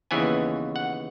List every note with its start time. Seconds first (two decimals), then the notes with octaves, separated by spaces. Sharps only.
0.11 D#2 C#3 E3 B3 G#5
0.76 F#5